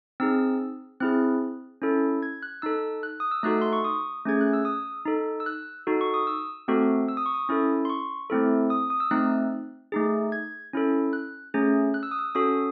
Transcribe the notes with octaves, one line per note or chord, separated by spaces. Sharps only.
C4 D#4 G#4 E6
C4 E4 G#4 F#6
C#4 E4 A4
G#6
F#6
D#4 A4 E6
F#6
D#6
E6
A3 D#4 F#4 A4 F#6
C6
C#6
D#6
A3 C#4 G#4 G#6
F#6
E6
D#6
D#4 A4
E6
F#6
D#4 F#4 A4
C#6
D#6
E6
A3 C4 F#4 A4
E6
D#6
C#6
D#6
C#4 E4 A4
C6
C#6
A3 C4 E4 A4
D#6
D#6
E6
A3 C4 D#4 F#6
A3 D#4 G#4
G#6
C#4 E4 A4
F#6
A3 C#4 G#4
F#6
E6
D#6
E6
C#4 F#4 A4 D#6